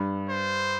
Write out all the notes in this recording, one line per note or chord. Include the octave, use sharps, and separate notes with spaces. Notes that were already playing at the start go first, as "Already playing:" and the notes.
Already playing: G2
C5